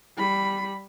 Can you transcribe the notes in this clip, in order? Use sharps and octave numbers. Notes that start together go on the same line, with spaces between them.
G3 B5